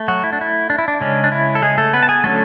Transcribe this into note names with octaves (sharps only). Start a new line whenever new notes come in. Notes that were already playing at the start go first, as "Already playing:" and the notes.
Already playing: A3
F#3 F#4
E4
D4
E4
D4
E4
D4
C#3 G#3 C#4
D4
E4
A4
G#3 G#4
A3 A4
B3 B4
A5
G#4 G#5
D3 F#3 A3 C#4 A4